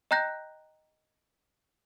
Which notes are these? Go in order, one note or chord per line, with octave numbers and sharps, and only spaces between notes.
D#5 G5 A#5 F#6 G6 A#6